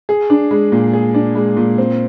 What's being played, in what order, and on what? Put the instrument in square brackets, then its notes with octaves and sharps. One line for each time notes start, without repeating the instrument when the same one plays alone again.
[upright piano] G#4
D4
G#3
A#2
G#4
D4
G#3
A#2
C4